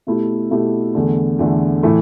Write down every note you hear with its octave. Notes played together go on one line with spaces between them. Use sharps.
B2 A3 E4 G4
B2 A3 E4 G4
E2 D3 A3
E2 D3 A3
A2 E3 A3